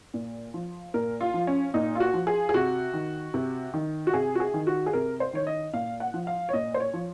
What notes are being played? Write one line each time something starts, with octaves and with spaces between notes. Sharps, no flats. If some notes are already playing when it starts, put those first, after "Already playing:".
A#2
F3
A#2 A#4
F4
F3
C#4
A#2 D#4
F4
F#4
F3
G#4
G#4
C3 F#4
D#3
C3
D#3
F#4
C3 G#4
F#4
G#4
D#3
F#4
G#4
C3 A#4
C5
D#3 C#5
D#5
A#2 F5
F#5
F3
F5
C#5
A#2 D#5
C5
C#5
F3